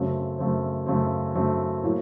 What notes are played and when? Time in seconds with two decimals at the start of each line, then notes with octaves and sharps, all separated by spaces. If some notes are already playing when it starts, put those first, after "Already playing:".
Already playing: F#2 C#3 A3 C4
0.39 F#2 C#3 A3 C4
0.86 F#2 C#3 A3 C4
1.35 F#2 C#3 A3 C4
1.83 A2 F#3 A#3